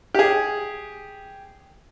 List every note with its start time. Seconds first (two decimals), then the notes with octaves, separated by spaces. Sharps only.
0.14 G4 G#4